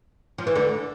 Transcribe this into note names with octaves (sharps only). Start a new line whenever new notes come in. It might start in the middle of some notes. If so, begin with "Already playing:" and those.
F3
E3
D2 D3